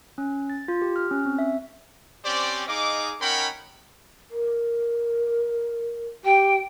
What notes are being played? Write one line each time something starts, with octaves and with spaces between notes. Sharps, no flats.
C#4
A6
F4
G4
F6
C#4
C4
E5
C4 C#4 G4 C5 D5
D#4 G#4 D#5 F5 D6
C#4 D#4 A#4 F#5 G5 B5
A#4
G4 G5